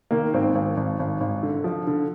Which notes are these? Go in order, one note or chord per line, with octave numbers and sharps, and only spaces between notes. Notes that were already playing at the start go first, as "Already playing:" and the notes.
D#3 A#3
G#1 C4
G#1 C4
G#1
G#1
G#1
D3
F3
D3